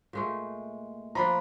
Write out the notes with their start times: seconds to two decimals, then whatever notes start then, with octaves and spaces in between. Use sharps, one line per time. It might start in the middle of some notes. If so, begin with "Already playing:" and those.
0.13 A#2 G#3 A3
1.15 F3 D4 A#5 B5